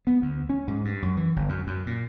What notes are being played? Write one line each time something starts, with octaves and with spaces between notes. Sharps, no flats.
B3
D2
C#4
G#2
G2
F#2
E3
G1
F#2
F#2
A#2